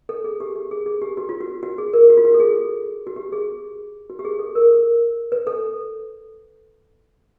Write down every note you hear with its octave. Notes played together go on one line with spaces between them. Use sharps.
A4
G#4
G4
G4
G#4
G#4
G4
F#4
F4
F#4
F#4
G#4
A#4
F#4
F4
F#4
A4
G#4
F#4
G4
G#4
F#4
G4
G#4
A4
A#4
B4
A4